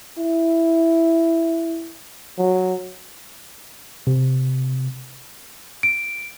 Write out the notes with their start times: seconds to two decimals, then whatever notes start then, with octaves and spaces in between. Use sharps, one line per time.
0.18 E4
2.38 F#3
4.07 C3
5.83 D7